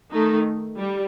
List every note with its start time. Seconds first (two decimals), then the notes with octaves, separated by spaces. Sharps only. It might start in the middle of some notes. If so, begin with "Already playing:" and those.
0.12 D#3 A3 D#4
0.78 G3